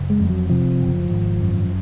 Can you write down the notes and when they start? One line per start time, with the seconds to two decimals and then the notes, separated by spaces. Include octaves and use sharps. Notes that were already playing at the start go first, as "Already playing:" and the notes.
Already playing: F#1
0.10 G#3
0.20 F2
0.30 F#3
0.50 C3 F3
0.80 F#1
1.10 G#1
1.41 F#2